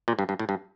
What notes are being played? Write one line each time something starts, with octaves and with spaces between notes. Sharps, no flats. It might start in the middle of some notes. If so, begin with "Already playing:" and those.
A#2
G2
G2
A2
G2